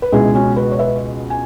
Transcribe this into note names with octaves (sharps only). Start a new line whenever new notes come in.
B4
C#2 B2 G#3 E4 G#4
C#4 F#4
F#4 B4
C#5
B4 E5
G#5